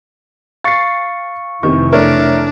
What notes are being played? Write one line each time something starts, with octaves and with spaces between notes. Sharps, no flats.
F5 C#6 A6 C7 C#7
F1 C3 D#3 E3 C#6
A3 D4 A#4 C#5 D5 E5